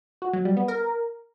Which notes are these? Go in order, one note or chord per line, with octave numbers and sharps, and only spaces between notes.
F#4
F#3
G3
B3
A#4